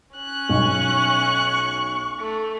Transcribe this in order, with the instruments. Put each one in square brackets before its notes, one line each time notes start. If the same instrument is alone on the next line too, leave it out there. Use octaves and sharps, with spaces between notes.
[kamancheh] C#4 F#6
[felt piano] B1 [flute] C#6
[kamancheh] A3